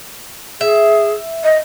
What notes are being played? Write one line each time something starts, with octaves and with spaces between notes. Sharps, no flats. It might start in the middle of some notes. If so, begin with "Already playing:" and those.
G#4 E5
D#5